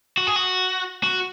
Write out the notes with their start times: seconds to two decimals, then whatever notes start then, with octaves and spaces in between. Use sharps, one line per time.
0.17 F#4
0.27 G#4
0.36 F#4
1.03 F#4